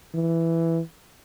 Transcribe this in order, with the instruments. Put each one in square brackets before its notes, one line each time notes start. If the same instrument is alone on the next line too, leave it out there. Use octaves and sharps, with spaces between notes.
[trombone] E3